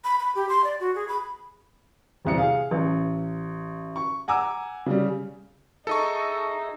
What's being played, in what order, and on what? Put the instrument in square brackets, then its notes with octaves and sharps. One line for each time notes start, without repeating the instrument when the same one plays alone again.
[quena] B5
B5
G4
C6
D5
F#4
G#4
B5
[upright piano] E1 C2 C#7
G#4 F5
A1
C#6
F#5 G#5 A#5 D6 E6
C#3 G3
[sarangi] D#4 [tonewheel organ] G#4 E5 A#5 [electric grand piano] A4 D#5 C#6